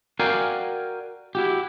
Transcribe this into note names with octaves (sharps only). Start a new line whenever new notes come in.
F#4 A#4 D5 F5 G5 G#5
E4 F#4 G4